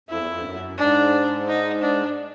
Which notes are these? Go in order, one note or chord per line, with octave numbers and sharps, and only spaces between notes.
F2 E4
E2
F2
G2
F#2
G#2 D4
D#4
D4